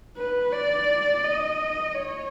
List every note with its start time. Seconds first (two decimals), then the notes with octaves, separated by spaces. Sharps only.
0.17 B4
0.53 D5
1.23 D#5
1.95 C#5